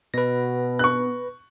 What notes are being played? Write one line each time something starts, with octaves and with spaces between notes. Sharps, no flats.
B2 B4 A#6
C#6 F#6